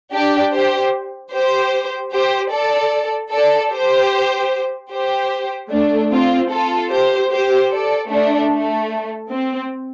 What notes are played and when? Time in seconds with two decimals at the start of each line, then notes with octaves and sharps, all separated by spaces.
0.12 D4 G4
0.52 G4 C5
1.32 G4 C5
2.12 G4 C5
2.52 A4 D5
3.32 A4 D5
3.72 G4 C5
4.91 G4 C5
5.71 A3 D4
6.11 C4 F4
6.51 F4 A4
6.91 G4 C5
7.31 G4 C5
7.72 A4 D5
8.10 A3 D4
8.50 A3
9.30 C4